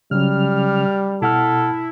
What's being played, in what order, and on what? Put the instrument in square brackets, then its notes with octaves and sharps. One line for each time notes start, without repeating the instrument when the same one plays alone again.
[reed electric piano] C#3 F#3 C#4 [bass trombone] G3 [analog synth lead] F6
[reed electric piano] B2 F#5 F6 [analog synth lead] E4 [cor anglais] A4